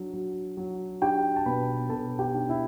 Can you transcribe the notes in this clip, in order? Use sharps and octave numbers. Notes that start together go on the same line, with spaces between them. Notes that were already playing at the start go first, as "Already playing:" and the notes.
Already playing: F#3 D4
F#3
F#3
D4 G4 G5
A5
B2 B4 B5
B2 A4 A5
G4 G5
D4
E4 E5